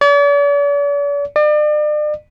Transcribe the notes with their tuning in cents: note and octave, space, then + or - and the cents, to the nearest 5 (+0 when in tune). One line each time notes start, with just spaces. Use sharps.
D5 -45
D5 +40